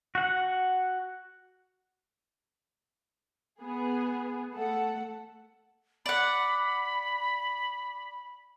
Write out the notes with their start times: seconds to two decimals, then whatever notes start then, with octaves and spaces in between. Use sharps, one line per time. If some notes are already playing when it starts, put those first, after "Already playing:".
0.15 F#4 F#5
3.62 B3 G#4
4.53 A3 A4 F#5
6.06 D5 F#5 B5